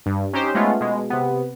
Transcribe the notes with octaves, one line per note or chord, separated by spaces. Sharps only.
G2
C#4 D#4 G4 C5
G#3 A3 B3 C#4 F4
B2 G#3
C3 B3